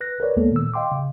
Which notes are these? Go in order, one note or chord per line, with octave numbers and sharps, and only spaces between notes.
B4 F#6 A#6
A#4 B4 C#5 D5
D#2 G#3 A#3 B3 A4
A#2 D#3 E6
D#5 F5 G5 C6 D6
C#3